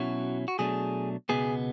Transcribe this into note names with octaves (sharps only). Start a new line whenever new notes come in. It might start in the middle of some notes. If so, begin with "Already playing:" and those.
Already playing: B2 F#3 C#4 E4 F#4
F#4
B2 F#3 A3 D4 G#4
C#2 B2 G#3 B3 G#4